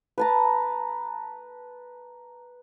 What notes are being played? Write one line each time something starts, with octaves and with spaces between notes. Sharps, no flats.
B4 A5 A#5